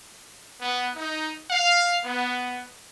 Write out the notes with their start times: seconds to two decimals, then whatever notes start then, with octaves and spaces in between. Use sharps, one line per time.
0.61 B3
0.94 D#4
1.50 F5
2.03 B3